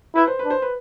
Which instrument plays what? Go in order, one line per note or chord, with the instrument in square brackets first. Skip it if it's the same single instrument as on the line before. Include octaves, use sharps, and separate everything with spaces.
[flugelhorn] E4 [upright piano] B4
[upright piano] C5
B4
[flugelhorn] D4
[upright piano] C5
B4